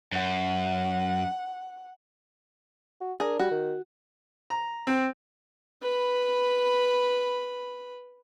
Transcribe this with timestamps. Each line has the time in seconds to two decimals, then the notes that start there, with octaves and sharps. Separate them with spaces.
0.12 F#2 F#5
3.01 F#4
3.20 D4 G#4 A#4
3.39 G3 F#4
3.51 D#3
4.50 A#5
4.87 C4
5.82 B4 B5